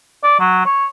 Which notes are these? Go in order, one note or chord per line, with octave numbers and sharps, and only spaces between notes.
D5
F#3
C#5